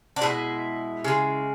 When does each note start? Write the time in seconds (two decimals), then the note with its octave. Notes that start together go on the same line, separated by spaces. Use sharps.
0.16 D4
0.21 B2 G#3 E4
1.04 C#3 G#3